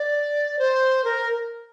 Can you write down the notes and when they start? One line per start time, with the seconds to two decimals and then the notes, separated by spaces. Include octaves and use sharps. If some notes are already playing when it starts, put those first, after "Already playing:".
Already playing: D5
0.59 C5
1.04 A#4